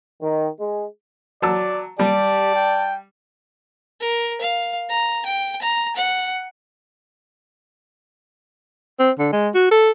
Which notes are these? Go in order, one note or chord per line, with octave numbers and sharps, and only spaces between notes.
D#3
G#3
F#3 D5 A5 E6
G3 G4 D5 A5
G5
A#4
F5
A#5
G5
A#5
F#5
C4
D3
G#3
F#4
A4